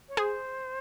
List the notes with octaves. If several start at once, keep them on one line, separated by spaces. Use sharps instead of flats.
C#5
G#4 C5